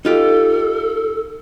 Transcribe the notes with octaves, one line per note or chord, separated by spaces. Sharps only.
D#4 F4 G4 A4